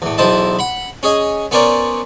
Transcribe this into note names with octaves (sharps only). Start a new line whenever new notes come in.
E2 A2
B1 E2 E4 C5 D#5 A5
F#5 B5
C#4 G#4 D#5
B3 C#4 A#4 C5 D5 C#6